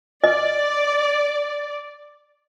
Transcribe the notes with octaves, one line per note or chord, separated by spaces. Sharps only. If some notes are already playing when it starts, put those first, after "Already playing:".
D5 D#5